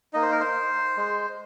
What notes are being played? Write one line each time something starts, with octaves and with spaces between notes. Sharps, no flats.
A#3 D#4 D#5
C5
A#4
C5
G#3